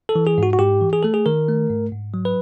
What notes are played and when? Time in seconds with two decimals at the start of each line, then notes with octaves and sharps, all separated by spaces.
0.09 A4
0.16 E3
0.27 G#4
0.38 G#2 F#4
0.53 F#4
0.59 G#2 G4
0.81 E3
0.93 G#4
1.03 A3 A4
1.14 G#4
1.26 D#3 A#4
1.48 A3
1.70 G#2
1.92 G#2
2.14 F#3
2.25 B4